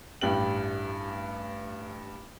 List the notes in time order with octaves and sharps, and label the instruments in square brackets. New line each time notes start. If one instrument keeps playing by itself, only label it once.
[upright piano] A1 G2 G3 G5 F#7